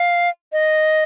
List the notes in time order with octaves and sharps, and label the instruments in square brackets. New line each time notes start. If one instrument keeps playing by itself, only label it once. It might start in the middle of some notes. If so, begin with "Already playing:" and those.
Already playing: [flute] F5
D#5